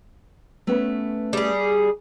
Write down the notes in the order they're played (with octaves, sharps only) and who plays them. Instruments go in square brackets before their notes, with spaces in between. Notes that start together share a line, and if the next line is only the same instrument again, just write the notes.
[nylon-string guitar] A3 B3 C#4
[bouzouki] G3 G#4